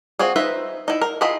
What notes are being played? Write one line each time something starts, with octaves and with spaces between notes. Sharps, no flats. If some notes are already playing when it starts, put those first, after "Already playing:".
C4 F4 F#4 G#4
D#4 F4 B4 C5 E5
D#4 E4
A#4
E4 F4 G#4 D#5 B5